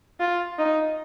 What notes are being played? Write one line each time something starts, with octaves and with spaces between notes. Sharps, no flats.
F4
D#4